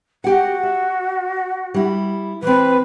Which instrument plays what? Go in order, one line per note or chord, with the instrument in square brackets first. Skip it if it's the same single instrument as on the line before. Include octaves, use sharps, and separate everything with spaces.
[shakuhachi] F#4 [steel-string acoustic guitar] G4 F#5
[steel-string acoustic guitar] E5
G3 E4
[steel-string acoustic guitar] E3 C4 [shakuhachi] B4